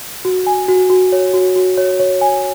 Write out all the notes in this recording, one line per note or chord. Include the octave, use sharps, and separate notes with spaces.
F#4
G#5
F#4
F#4
C#5
F#4
F#4
C#5
C#5
G#5